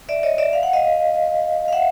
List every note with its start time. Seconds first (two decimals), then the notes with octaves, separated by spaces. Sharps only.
0.09 D5 E5
0.23 C#5 D#5
0.38 D5 E5
0.53 F5
0.63 F#5
0.73 D#5 F5
1.68 F5
1.73 E5 F#5